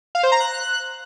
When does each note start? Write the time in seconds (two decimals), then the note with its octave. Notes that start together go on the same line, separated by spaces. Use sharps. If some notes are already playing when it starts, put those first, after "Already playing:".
0.15 F5
0.23 C5
0.32 A#5
0.40 F#6